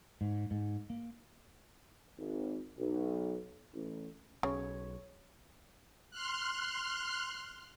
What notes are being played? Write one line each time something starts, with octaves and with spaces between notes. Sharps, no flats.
G#2
G#2
A#3
G#1
B1
A1
B1 C#3 C#5
C6 F6 F#6